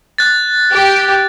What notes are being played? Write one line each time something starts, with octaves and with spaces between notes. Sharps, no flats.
F#6 A6
G4